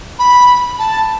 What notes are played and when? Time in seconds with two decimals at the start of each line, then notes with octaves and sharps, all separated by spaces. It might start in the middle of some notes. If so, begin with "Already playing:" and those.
0.19 B5
0.79 A5